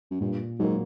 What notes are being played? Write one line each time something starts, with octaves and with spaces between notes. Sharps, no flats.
F#2
G2 A#2
G#2 F#3 A#3